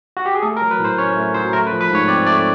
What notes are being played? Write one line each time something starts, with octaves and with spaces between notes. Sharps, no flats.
F#4
G4
G#4
A3 A4
A#4
F#3
B4
A2
C5
C#4 C#5
A3
F#3 C5
A3 A#4
B4
F3
B4
G#2 C#5
C4 D5
A3 D5